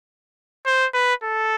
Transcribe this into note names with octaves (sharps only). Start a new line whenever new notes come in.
C5
B4
A4